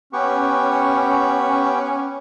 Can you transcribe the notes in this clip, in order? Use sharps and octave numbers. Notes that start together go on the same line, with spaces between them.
B3 C#4 G4 C#6